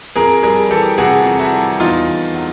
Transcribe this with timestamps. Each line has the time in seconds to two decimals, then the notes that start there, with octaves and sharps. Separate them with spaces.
0.16 F2 G#4 A#4
0.43 G3 G#4 A#4
0.71 E3 G4 A4
0.98 C3 F#4 G#4
1.25 F2
1.39 E4 F#4
1.52 G3
1.80 E2 D#4 F4
2.07 E2
2.34 F#3